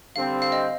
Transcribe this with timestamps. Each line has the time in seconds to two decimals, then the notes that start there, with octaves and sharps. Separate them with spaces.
0.15 D3 G3 C4 F5
0.42 F5
0.52 D#5